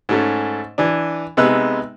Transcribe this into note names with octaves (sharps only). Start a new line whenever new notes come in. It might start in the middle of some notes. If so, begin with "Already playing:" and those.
G#2 A3 C#4
E3 D4
C3 G#3 B3 D#4 E6 F#6